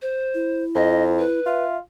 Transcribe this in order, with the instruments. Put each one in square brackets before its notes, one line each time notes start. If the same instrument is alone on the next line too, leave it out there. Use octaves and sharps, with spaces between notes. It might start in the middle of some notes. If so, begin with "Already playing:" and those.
[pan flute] C5
[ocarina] E4
[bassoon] F2 [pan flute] D#5
[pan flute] B4
[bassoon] F4 [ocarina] E5